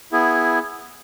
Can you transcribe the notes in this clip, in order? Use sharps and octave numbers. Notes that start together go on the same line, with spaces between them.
B3 E4 G#4